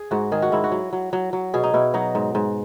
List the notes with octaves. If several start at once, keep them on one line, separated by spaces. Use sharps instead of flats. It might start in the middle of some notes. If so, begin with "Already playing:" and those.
Already playing: G#4
G#2 F#4
D#3 G#4
F#4
G#2 E4
F#4
F#3
F#3
F#3
F#3
B2 G#4
D#4
B2 E4
F#3 D#4
G#2
G#2